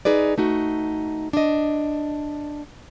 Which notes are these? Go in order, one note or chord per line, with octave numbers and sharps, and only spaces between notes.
D#4 G#4 B4 D5
A3 D#4 F#4
D4 D#5